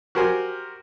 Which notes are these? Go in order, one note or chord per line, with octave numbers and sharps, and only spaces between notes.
F#4 G4 A#4 C5 G#5